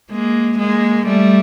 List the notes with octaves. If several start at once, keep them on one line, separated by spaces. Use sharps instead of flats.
G#3 A#3
G#3 A#3
G3 A3